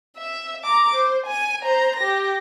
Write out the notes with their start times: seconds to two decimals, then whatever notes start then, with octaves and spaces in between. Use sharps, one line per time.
0.17 E5
0.64 A#5 D6
0.95 C5
1.26 G#5 D#7
1.63 C5 A#5
1.96 G4 A#6